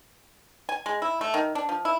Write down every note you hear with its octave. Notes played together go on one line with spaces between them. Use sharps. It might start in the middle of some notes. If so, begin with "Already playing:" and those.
G#5
G#3
E4
A3
D#3
D4
F3
E4